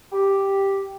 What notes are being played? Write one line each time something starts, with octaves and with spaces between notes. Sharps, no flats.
G4